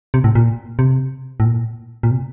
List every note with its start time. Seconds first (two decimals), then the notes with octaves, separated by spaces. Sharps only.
0.14 C3
0.24 A2
0.35 A#2
0.79 C3
1.40 A2
1.45 A#2
2.03 A#2
2.11 C3